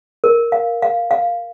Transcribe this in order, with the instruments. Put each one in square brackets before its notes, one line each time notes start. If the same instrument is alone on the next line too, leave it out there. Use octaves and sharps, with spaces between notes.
[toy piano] A#4
F5
F5
F5